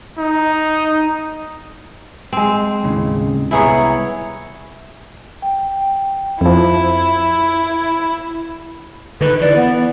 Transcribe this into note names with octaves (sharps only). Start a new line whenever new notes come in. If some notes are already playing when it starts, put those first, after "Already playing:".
D#4
G#3 C4
D#2 A2 C#3
C2 B3 E4 G#4 C#5 A#5
G5
F2 F3 E4
D3 D#3 B4
E3 D5
B3